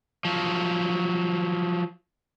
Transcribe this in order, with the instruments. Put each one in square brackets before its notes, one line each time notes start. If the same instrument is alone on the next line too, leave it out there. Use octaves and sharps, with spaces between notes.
[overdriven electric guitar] F3 F#3